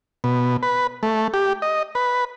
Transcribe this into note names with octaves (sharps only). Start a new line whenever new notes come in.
B2
B4
A3
G4
D#5
B4